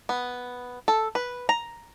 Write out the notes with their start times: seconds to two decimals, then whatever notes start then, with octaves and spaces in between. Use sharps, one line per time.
0.09 B3
0.88 A4
1.15 B4
1.49 A#5